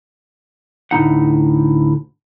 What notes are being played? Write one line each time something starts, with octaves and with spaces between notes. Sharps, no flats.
D2 A2 D#4 F#5